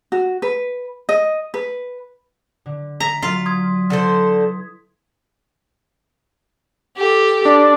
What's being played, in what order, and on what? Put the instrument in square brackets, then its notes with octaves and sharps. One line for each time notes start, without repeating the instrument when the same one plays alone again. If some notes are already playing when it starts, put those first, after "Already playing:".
[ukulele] F#4
B4
D#5
B4
[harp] D3
[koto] A#5 [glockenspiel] B6
[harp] F#3 [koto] F4 [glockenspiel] B6
[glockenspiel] C6 D#6 G#6
[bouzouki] D3 A4 C5 [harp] E4 B4
[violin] G4 A4
[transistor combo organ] D4